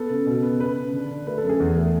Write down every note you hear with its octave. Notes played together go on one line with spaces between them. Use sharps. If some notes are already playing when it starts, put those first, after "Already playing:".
Already playing: B3 A4
C#3
B2
B3
C#3 B4
C#3
D3
D3
A3 B4
A4
F#2
G#4
E2
A3